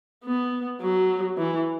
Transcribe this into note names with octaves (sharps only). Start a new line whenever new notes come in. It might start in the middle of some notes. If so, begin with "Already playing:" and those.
B3
F#3
E3